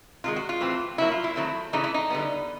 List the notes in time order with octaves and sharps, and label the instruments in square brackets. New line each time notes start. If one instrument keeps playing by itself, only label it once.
[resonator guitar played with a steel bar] C3 D#3 G#3 F4
F#4
F4
A2 E3 A3 C4
C#3 F#3 A#3 E4
F4
E4
D#3 F#3 A3 C4
C#3 E3 A3 D#4
E4
D#4
D3 G3 B3